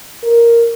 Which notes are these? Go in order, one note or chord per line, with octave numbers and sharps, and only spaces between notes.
A#4